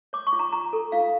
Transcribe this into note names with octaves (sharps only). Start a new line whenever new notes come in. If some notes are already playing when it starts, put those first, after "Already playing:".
C#5 D6
C#6
F4
A#5
F4 A#5
A4
F4 F5